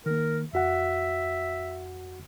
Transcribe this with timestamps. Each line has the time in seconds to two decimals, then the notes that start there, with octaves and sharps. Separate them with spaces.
0.06 D#3 A#3 A#4
0.53 F2 F#4 E5 F#5